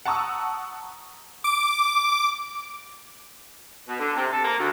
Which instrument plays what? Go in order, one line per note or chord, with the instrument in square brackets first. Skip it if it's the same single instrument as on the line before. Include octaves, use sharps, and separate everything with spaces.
[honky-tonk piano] F#5 A5 A#5 C#6 D#6 E6
[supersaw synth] D6
[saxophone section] B2
D3
C3
A4
A#3
D2